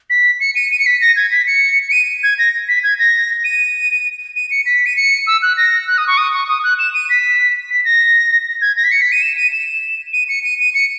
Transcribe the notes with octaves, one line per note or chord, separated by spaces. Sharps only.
B6
C#7
D#7
D#7
C#7
B6
A#6
G#6
B6
C#7
C#7
D#7
G#6
A#6
B6
G#6
A#6
D#7
D#7
C#7
B6
D#7
C#7
E6
F#6
A#6
F#6
D#6
C#6
D#6
C#6
D#6
F#6
E7
D#7
B6
B6
A#6
G#6
A#6
B6
C#7
B6
D#7
E7
D#7
E7
D#7
C#7
D#7
D#7
C#7